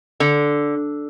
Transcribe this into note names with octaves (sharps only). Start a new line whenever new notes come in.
D3